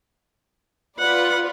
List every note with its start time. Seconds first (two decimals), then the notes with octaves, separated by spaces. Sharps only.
1.00 F4 B4 D5 F#5